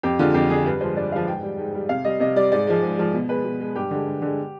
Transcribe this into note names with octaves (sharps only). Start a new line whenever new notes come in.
F2 G4
D3 G#3 F4
F2 G4
D3 G#3 G#4
G2 B4
F3 G#3 C5
G2 D5
F3 G#3 F5
G#2 G5
G3
G#2
G3
C3 F5
G3 D#5
C3 D#5
G3 D5
G#2 D5
F3 G#3
G#2
F3 G#3
B2
G#3 B4
B2
G#3
G2 G4
D3 G#3
G2
D3 G#3